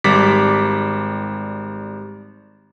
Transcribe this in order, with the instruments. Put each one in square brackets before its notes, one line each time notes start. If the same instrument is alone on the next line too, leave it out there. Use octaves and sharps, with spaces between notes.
[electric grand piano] G#1 G3 D6 B6